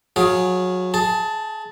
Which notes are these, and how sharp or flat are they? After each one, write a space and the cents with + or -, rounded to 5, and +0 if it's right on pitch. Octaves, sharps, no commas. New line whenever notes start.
F#3 -20 G#4 +10 F5 +0
G#4 +25 A5 +0